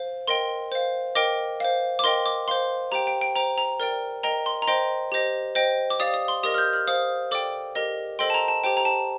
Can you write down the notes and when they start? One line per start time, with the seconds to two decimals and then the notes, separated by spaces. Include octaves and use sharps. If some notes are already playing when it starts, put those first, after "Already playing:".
Already playing: C5 F5
0.27 A#4 D#5 G5 C6
0.72 C5 F5
1.15 A#4 D#5 G5 D6
1.60 C5 F5
1.99 D6
2.04 A#4 D#5 G5 C6
2.26 D6
2.48 C5 F5 C6
2.92 G4 C5 G5 A#5
3.07 G5
3.21 G5
3.35 C5 G5 A#5
3.58 A#5
3.80 A#4 D5 G5
4.23 A#4 D#5 G5 A#5
4.46 C6
4.62 A#5
4.68 C5 D#5 G5 C6
5.12 G4 C5 D#5
5.55 C5 D#5 G5
5.90 D6
5.99 G4 D5 F5 D#6
6.14 D#6
6.28 C6
6.43 G4 A#4 D#5 D#6
6.54 F6
6.58 G6
6.73 F6
6.87 C5 F5 D#6
7.31 A4 D5 G5 D6
7.75 G4 A#4 D#5
8.19 A4 C5 D#5 G5 C6
8.30 A5
8.34 A#5
8.48 A5
8.64 G4 C5 G5
8.77 A#5
8.85 A5